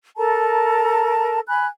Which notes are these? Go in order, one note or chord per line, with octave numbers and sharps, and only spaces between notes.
A4 A#4 A5 A#5
G#5 B5 F#6